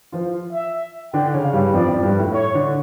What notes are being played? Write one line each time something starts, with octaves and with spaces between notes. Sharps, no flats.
F3 F4
E5
D3 D4 G5
C#3 C#4
F5
G2 G3
F2 F3 D5
F2 F3
G2 G3
A2 A3
C#5
D3 D4